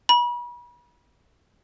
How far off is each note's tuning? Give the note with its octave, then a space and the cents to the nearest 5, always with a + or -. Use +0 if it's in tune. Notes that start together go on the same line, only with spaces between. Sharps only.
B5 -40